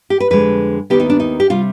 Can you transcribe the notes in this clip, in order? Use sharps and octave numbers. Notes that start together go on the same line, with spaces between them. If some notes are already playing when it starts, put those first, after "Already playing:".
G4
B4
F2 D3 G#3 B4
D#2 D#3 B3 G4
D#4
D4
D#4
G4
C3 G3 F4